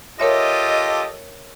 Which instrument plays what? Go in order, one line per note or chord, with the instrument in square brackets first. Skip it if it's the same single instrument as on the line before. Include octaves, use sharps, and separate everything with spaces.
[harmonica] F4 G4 A4 [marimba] A#4 C#5 E5 [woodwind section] D#5